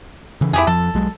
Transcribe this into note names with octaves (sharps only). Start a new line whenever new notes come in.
C#3 E3
F2 E4 G4 G#4
F2 F3 A4
B1 F#3 G#3